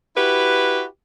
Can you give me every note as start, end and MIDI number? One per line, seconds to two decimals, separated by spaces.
0.17 0.84 64
0.17 0.84 66
0.17 0.84 67
0.17 0.84 71